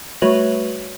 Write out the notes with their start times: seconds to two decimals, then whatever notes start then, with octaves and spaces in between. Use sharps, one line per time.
0.22 G3 A3 F#4 B4 C#5 F#7